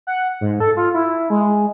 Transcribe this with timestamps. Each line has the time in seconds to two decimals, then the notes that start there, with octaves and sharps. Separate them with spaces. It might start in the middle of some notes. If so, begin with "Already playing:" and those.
0.07 F#5
0.41 G#2
0.60 A4
0.77 F4
0.94 E4
1.30 G#3